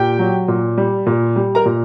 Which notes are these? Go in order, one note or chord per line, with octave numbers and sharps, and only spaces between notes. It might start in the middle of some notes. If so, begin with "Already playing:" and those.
Already playing: A#2 G4 G5
F#3
A#2
G3
A#2
G3
A#4 A#5
A#2